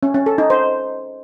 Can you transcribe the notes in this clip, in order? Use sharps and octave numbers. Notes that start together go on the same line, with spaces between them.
C#4
C#4
A4
D#4
C5